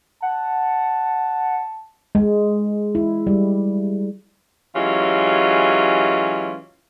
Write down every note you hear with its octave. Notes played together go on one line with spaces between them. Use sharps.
F#5 A5
G#3
E4
G3
E3 F#3 G#3 C#4 F4 G4